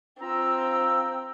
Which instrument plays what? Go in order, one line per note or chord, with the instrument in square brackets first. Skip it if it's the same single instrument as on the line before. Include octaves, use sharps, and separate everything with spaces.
[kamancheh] C4 [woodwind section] F4 A#5 E6